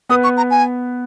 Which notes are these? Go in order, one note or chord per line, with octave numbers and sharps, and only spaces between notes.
B3 B4 D#6
C#6
A#5
G#5